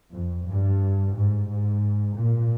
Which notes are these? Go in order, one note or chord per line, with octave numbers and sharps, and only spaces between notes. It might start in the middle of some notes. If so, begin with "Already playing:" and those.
F2
G2
G#2
G#2
A#2